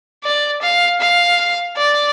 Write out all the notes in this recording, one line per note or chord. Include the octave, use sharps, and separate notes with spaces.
D5
F5
F5
D5